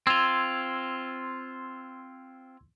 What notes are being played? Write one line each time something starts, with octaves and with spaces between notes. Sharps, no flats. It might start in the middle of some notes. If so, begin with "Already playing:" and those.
C4 F4 C6 E6 G#6